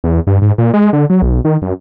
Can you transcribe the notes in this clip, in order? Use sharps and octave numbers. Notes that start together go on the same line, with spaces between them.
E2
G2
G#2
A#2
G#3
D3
F#3
B1
D#3
F#2